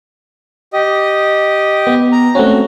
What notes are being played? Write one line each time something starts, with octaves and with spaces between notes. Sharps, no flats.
G4 D#5
B3
A#5
A3 C4 C#4 F#4